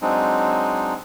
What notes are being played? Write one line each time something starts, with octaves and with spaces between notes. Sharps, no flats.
F#3 G#3 C4 D4 D#4